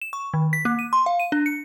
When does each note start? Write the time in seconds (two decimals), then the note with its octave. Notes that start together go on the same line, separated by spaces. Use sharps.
0.02 E7
0.13 C#6
0.34 D#3
0.53 B6
0.65 A#3
0.79 D#7
0.93 C6
1.06 F5
1.20 D#7
1.32 D4
1.46 C#7